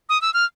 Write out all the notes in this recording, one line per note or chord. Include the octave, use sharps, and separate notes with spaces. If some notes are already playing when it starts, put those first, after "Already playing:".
D#6
E6
F6